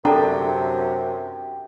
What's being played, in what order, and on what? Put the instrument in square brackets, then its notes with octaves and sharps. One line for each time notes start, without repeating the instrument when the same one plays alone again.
[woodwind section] F#2 C3 [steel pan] D4 [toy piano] A4 A#5 [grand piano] G5